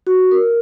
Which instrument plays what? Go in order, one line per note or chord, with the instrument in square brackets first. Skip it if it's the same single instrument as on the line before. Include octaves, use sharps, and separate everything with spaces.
[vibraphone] F#4
A#4